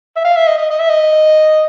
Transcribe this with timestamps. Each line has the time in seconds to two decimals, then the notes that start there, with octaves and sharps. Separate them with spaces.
0.16 E5
0.24 F5
0.36 E5
0.47 D#5
0.58 D#5
0.70 D#5
0.80 E5
0.90 D#5